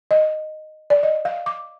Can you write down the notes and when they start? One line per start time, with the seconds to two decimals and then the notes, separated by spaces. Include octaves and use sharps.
0.11 D#5
0.90 D5
1.03 D#5
1.25 F5
1.46 D6